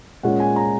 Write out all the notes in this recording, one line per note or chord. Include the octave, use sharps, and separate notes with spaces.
A#2 G#3 C#4 F#5
G#5
A#5